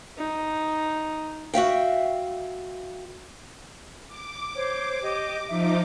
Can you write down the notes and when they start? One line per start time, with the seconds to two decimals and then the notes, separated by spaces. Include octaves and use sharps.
0.18 D#4
1.54 F#4 E5 F5 G5
4.07 D6
4.55 C5 C#5
5.03 G4 D#5
5.49 F3 D#4 E5 D6